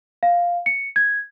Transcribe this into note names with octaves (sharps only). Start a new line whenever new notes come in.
F5
C#7
G#6